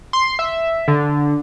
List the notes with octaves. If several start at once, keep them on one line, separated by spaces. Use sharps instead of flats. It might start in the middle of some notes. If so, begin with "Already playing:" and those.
C6
E5
D3